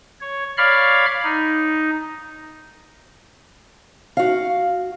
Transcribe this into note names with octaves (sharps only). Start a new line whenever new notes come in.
C#5
C#5 D5 F5 B5 F6
D#4
F#4 F5